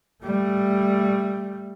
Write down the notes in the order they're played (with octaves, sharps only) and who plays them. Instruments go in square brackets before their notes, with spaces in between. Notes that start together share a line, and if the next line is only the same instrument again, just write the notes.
[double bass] G3 A3